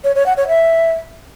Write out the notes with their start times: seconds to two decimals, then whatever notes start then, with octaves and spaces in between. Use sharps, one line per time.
0.04 C#5
0.15 C#5
0.26 F#5
0.37 C#5
0.48 E5